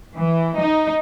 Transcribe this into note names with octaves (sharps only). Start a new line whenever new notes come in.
E3
D#4